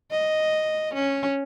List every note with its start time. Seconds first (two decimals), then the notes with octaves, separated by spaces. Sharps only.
0.11 D#5
0.94 C#4